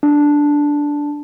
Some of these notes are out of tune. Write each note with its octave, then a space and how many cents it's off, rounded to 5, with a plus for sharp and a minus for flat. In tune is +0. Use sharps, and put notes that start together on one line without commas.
D4 -5